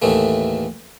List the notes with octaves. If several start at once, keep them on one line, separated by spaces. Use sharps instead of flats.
D#2 A2 E3 A3